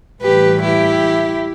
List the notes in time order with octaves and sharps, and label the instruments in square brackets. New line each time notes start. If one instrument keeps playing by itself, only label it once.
[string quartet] A2 E3 G3 G4 B4
E4 G4